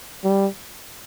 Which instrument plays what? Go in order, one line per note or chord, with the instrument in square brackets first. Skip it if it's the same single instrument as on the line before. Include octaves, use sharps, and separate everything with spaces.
[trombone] G3